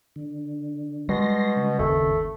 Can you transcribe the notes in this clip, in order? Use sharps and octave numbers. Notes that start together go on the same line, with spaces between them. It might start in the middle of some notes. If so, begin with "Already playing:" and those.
D3
B2 G3 G#3 C6 A#6
C#3
G1 D#2 A3